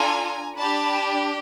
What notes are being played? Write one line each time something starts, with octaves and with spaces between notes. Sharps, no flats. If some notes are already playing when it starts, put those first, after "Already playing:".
Already playing: D4 F4 A4 G#5 A#5
D4 G4 A5 B5